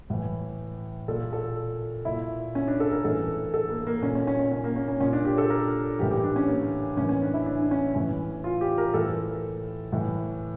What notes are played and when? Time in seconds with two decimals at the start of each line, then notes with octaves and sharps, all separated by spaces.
0.10 A2 E3
1.08 A#2 A4
1.33 A4
2.05 A#2 E4
2.55 C#4
2.68 D4
2.80 A4
2.92 A#4
3.05 A2 E3 A4
3.54 A4
3.70 A#3
3.87 A#3
4.02 A#2 C#4
4.15 C#4
4.27 C#4
4.40 C#4
4.52 C#4
4.64 A#3
4.76 C#4
4.88 C#4
5.00 A#2 C#4
5.13 D4
5.25 G4
5.38 A4
5.50 A#4
5.99 E3 G4
6.03 A2
6.11 G4
6.24 D4
6.36 C#4
6.48 A#3
6.97 A2 E3 C#4
7.09 C#4
7.22 D4
7.34 E4
7.46 D4
7.62 D4
7.71 C#4
7.95 A2 E3 C#4
8.44 F4
8.61 G4
8.78 A#4
8.94 A2 E3 A4
9.92 A2 E3